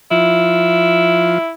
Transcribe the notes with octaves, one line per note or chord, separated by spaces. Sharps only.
F3 E4